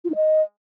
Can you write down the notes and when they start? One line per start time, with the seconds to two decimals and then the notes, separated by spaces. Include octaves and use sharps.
0.04 F4
0.10 D#4
0.15 D#5